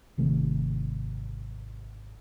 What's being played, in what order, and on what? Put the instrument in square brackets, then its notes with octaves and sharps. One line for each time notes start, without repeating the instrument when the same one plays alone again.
[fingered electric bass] G#1 C3 D#3 A3